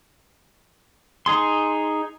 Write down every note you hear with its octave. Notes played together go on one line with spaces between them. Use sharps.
D#4 G#4 C6